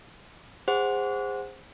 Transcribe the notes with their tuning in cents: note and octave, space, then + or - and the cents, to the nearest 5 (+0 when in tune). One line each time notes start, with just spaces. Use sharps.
G#4 -25 C5 +0 F#5 +0